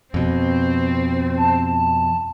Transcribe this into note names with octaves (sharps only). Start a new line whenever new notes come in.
F2 B2 C4
A5